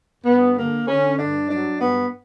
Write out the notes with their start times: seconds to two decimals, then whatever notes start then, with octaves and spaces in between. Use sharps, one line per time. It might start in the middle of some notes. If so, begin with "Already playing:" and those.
0.24 G2 B3
0.56 D3 A#3
0.87 D3 C#4
1.17 G2 D4
1.48 F#3 D4
1.78 G2 B3